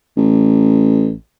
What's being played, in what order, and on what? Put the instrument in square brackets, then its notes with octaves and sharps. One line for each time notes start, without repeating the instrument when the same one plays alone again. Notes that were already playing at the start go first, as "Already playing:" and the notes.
[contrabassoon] A1